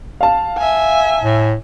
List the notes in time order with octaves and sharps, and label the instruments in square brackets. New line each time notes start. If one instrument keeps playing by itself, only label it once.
[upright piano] F5 A5
[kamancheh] E5 G#5
[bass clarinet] A2